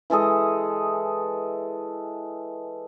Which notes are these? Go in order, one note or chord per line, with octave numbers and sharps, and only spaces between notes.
E3 G#3 A4 D#5